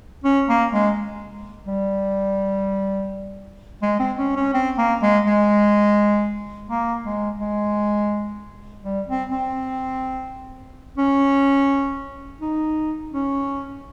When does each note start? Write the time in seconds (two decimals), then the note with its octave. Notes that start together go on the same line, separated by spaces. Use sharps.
0.24 C#4
0.48 A#3
0.73 G#3
1.67 G3
3.82 G#3
4.00 C4
4.18 C#4
4.36 C#4
4.54 C4
4.78 A#3
5.02 G#3
5.25 G#3
6.69 A#3
7.05 G#3
7.40 G#3
8.84 G3
9.08 C4
9.31 C4
10.98 C#4
12.41 D#4
13.12 C#4